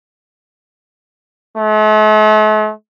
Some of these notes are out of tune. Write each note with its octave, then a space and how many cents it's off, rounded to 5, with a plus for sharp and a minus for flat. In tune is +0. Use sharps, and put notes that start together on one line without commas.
A3 -45